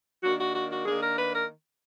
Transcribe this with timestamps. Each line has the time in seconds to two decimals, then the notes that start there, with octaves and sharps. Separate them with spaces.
0.24 D#3 A#3 D4 F#4
0.39 F#4
0.54 F#4
0.70 F#4
0.86 D#3 A#3 D4 G#4
1.01 A#4
1.17 B4
1.32 A#4